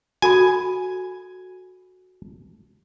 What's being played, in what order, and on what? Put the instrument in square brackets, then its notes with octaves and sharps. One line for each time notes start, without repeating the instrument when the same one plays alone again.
[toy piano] F#4 A4 B5 [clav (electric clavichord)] G#5